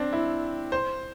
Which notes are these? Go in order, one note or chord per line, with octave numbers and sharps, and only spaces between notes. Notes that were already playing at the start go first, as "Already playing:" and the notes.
Already playing: C4 D4
E4
C5